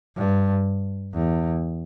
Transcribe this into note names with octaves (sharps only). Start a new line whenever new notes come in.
G2
E2